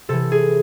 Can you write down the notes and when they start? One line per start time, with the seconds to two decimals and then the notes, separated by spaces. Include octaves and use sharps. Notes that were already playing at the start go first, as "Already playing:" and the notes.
0.09 C3 E3 A4
0.32 G#4